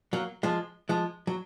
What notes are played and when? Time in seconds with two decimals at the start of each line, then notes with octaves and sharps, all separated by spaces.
0.13 F#3 A#3
0.43 F3 G#3
0.89 F3 G#3
1.27 F#3